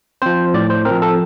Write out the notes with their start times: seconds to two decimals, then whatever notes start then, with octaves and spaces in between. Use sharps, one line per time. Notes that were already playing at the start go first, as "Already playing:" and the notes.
0.22 F3 C4 C5
0.54 A2 D5
0.70 C5
0.85 C4 A#4
0.91 F3
1.02 A4